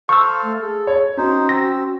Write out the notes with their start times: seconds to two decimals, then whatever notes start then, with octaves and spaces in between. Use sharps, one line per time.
0.09 A4 C5 F5 C#6 E6
0.43 A3
0.62 G#4 A4
0.87 C#5
1.17 C#4 D#4 F#4 C5
1.49 C4 E6 A#6